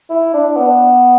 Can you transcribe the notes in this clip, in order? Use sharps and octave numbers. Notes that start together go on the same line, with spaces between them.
E4
D4
B3